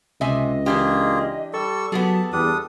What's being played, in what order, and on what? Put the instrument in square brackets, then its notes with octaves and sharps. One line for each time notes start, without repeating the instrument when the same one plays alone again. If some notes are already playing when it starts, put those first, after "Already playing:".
[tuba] C#2 [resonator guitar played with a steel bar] C3 E5 G#5 [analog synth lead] D#5
[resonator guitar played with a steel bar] E3 D4 G4 [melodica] A#3 F4 G#4
[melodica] G3 C#6 E6 [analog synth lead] A4
[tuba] F#3 [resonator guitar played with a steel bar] B3 G4 G#4 [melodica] A5
[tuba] E2 [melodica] G3 D4 D#6